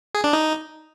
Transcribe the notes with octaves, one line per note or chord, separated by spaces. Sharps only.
G#4
D4
D#4